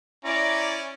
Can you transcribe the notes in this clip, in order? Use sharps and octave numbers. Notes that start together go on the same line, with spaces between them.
C#4 E4 D5 A#5